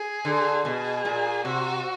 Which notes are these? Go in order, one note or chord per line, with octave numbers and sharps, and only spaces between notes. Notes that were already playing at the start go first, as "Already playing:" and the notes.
Already playing: G#4
D3
B2 G#4
A#2
C3 F#4